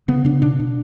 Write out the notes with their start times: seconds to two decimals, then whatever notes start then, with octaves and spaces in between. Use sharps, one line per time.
0.08 C#3 B3
0.25 C#3 D4
0.42 B2 D4
0.60 B2